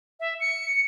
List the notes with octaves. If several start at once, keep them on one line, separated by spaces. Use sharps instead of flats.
E5
C#7